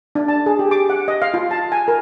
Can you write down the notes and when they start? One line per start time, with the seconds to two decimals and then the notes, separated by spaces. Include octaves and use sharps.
0.15 D4
0.28 A5
0.46 G#4
0.59 G4
0.71 D6
0.90 F#5
1.08 D#5
1.22 F5
1.34 F4
1.51 A5
1.72 G#5
1.88 A#4